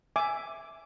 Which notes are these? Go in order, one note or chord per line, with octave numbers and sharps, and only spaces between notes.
E5 G#5 D6